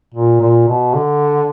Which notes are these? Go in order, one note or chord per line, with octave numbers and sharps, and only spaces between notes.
A#2
A#2
B2
D3